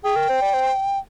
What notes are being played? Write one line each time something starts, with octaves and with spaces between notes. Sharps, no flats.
G#4 G5
A#4
C5
D5
C5